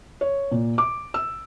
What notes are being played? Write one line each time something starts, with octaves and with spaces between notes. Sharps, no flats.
C#5
A#2
D6
E6